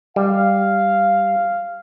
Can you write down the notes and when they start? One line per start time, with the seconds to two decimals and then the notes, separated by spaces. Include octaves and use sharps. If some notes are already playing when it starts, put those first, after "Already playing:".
0.16 G3 F5